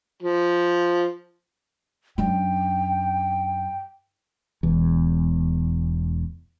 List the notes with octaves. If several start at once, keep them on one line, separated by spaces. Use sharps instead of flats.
F3
F#2 D4 G5
E1 E2